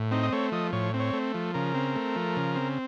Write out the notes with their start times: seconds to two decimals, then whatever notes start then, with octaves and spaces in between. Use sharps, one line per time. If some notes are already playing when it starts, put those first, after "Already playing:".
Already playing: A2
0.11 C4 D#4
0.23 D#5
0.32 A3 C#5
0.52 F3 D#5
0.72 A2 C#5
0.94 C4
1.00 C#5
1.13 A3
1.34 F3
1.54 C#3 A#4
1.74 C4
1.95 A3
2.16 F3
2.36 C#3
2.56 C4